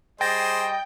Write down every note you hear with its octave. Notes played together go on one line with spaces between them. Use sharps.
G3 G#4 C5 D#5 G5 A6 A#6